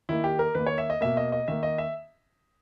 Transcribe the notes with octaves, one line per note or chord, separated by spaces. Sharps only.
D#3 A#3 E4
G4
A#4
D#3 A#3 B4
C#5
E5
D#5
B2 A#3 E5
D#5
D#5
D#3 A#3 E5
D#5
E5